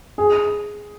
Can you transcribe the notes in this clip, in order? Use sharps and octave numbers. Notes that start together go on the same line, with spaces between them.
G#4